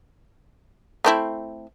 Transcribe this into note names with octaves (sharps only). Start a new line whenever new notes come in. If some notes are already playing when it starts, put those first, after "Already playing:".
A3 C4 E4